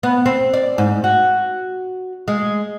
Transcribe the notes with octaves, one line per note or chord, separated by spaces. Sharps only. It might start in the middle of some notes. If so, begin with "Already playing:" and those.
B3
C4
D5
G#2
F#4
G#3